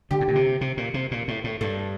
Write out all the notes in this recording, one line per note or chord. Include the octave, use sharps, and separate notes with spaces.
D3 G4
A2
A#2
C3
C3
A#2
C3
A#2
A2
A2
G2 A4